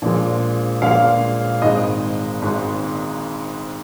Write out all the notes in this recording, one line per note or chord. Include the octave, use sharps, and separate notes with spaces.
A#1 A#2 F3 G#3
A#1 A#2 F3 G#3 F5
G#1 G#2 G#3 D#5
G#1 G#2 G#3